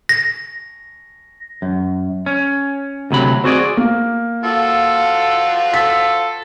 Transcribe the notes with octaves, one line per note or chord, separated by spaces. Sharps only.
A#6
F#2
C#4
D2 C3 F#3 B5
C4 F#4 G#4 D5
A#3
F3 F4 F#4 A4
A4 B6